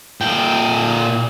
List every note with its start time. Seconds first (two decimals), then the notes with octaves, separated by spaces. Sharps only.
0.21 A#2 G5